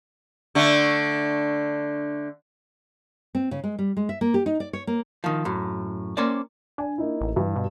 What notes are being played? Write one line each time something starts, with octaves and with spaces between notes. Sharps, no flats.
D3 A3
C4
C#3
G#3
G3
G#3
E5
A#3
G4
D#4
D5
C#5
A#3
D#3 F3
F#2 A2
A#3 C#4 C5 D5
D4 G#5
A#3 D#4 E4
A1
G2 E3
B2